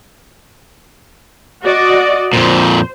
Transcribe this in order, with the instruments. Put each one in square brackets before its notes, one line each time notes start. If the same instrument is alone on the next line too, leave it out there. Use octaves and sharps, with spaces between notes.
[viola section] F#4 D5 D#5
[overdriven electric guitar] F2 A#2 [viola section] C5